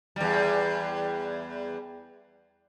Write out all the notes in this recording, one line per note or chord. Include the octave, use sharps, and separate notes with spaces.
E2 G3